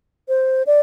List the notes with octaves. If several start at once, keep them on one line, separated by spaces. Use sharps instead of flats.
C5
D5